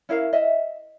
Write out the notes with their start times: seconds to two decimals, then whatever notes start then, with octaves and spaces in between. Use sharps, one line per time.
0.09 C#4 E4 A#4 F5
0.33 D#5 E5